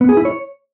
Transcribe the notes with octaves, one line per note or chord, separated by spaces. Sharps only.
B3
G#4
E4
C#5